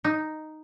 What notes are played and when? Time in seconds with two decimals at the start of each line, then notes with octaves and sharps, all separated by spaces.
0.04 D#4